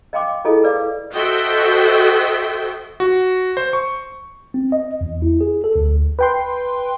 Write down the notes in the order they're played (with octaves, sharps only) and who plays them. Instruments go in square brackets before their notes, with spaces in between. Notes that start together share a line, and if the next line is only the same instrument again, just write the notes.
[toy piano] D#5 F5 G5 C6 D6
E4 F4 G#4 A4 D#5
B4 D5 F5 D6
[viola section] F#4 A4 C5 D#5 E5 G5
[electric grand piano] F#4
C5
C#6
[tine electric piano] C4
D#5
E2
E4
G#4
A4
D2
[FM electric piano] B4 G5 C6